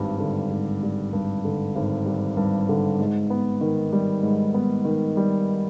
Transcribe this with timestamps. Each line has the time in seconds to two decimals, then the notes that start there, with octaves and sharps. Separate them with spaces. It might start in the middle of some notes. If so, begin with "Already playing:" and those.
Already playing: G#1 G2 G3
0.20 D3
0.51 G#1
0.83 G3
1.13 G2
1.45 D3
1.76 G#1
2.06 G3
2.37 G2
2.69 D3
3.00 G#2
3.30 B3
3.61 D#3
3.92 G3
4.23 G#2
4.54 B3
4.85 D#3
5.17 G3